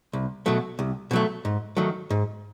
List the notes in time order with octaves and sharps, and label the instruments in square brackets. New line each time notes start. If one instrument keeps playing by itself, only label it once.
[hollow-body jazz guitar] C2
B2 F#3 A3
C2
B2 F#3 A3
G#2
D#3 F#3 A3
G#2